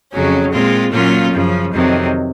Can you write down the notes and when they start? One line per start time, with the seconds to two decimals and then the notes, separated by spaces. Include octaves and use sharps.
0.12 F2 C#3 F#3 C#4
0.52 A#2 G#3 C4 F4
0.92 A#2 F#3 A#3 C#4 F4
1.33 F#2 C#3 F3
1.73 F2 C3 D#3 F#3